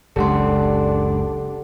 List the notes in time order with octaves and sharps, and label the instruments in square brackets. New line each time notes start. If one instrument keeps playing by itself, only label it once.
[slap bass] F#1 C#2 C#3 [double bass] D4 [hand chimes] G4 F#5 C6 [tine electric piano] A4